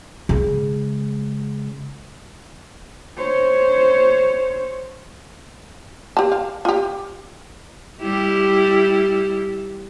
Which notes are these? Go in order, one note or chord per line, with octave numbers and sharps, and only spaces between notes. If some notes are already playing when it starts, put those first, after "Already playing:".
C#3 G#3
C5 C#5
G4 A5
F5
F4 G4
G3 E4 G4